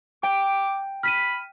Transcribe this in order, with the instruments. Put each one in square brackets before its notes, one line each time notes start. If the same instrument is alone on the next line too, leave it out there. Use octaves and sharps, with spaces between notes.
[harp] G5 [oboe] D6
[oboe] B5 [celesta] F6 B6 D#7